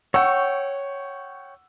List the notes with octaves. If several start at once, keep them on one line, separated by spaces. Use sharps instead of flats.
C#5 F#5 G5 C#6 E6